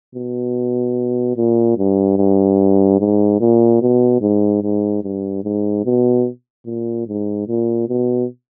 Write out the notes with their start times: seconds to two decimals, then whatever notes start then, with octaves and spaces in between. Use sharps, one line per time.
0.15 B2
1.36 A#2
1.78 G2
2.17 G2
2.99 G#2
3.40 A#2
3.82 B2
4.21 G#2
4.63 G#2
5.03 G2
5.44 G#2
5.85 B2
6.66 A#2
7.07 G#2
7.47 A#2
7.89 B2